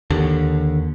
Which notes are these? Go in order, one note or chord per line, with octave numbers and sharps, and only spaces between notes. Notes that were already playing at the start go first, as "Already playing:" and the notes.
D#2 D3